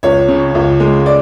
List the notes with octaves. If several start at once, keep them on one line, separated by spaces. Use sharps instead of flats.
C#2 C#5
C#3
C#2
G#3
D5